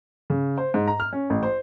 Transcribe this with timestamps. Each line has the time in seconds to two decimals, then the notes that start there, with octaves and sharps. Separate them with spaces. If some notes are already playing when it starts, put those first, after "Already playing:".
0.30 C#3
0.58 C5
0.74 G#2
0.87 A#5
1.00 F6
1.13 C#4
1.30 A1
1.43 C5